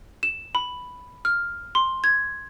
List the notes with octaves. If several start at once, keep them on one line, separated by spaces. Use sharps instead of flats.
E7
B5
F6
C6
G#6